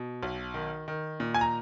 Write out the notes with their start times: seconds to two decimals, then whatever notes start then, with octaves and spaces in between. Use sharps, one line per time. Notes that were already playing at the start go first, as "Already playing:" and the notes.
Already playing: B2
0.23 B1
0.54 D#3
0.88 D#3
1.20 A#2
1.34 G#5
1.41 A#5